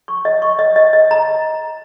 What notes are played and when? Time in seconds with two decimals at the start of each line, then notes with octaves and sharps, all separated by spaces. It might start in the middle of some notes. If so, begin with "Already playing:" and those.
0.08 C#6
0.25 D#5
0.42 C#6
0.59 D#5
0.76 D#5
0.93 D#5
1.11 A#5